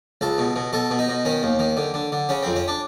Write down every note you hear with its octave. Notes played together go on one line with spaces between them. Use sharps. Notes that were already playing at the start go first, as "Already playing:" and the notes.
C#2 A4
B2
B2
B2 A4
B2
D#4
B2
D#3 C#4
D#2
D#3
D3
D3
D3
C#3 C#4
F2 C4
C#4
D4